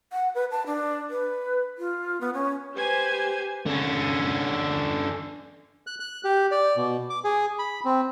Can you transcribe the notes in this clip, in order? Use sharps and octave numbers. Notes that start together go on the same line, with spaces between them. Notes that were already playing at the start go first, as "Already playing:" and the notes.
F#5
B4
A5
D4
B4
F4
B3
C#4
G4 B4 C5 G#5
D3 C#4
F#6
F#6
G4
D5
B2
D6
G#4
B5
C4